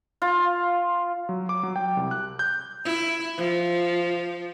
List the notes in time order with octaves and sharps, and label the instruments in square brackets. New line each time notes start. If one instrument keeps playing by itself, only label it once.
[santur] F4
[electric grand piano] F#3
D6
F#3
G5
C2
F#6
G6
[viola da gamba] E4
F3